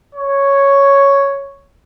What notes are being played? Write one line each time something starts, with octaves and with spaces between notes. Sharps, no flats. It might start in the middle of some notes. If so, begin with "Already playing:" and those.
C#5